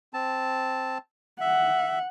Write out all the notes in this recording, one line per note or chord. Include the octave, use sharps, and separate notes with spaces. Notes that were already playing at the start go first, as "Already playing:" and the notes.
C4 A5
E5 F#5